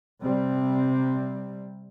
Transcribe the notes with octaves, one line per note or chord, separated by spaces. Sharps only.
C3 G3 C4